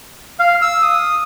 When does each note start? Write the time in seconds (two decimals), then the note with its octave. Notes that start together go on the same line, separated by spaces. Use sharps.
0.39 F5
0.62 E6
0.82 D#6